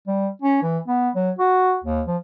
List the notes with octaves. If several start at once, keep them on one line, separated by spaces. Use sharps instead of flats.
G3
C#4
E3
B3
F#3
F#4
D#2
F3